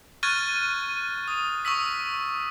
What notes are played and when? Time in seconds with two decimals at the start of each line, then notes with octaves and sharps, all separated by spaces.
0.23 C#6 F6 F#6 G#6 A6 D#7
1.28 D#6
1.65 C#6 D#6 E6 B6